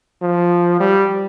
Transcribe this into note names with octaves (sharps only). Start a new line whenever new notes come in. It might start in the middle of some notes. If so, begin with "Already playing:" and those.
F3
G3